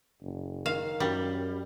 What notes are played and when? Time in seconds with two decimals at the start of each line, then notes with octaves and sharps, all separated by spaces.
0.22 F#1
0.66 D#3 F5
1.00 F#2 G3